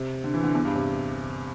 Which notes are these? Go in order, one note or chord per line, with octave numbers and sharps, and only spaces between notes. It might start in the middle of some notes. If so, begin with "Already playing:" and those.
Already playing: C3
D3
E3
D3
E2
G2
C3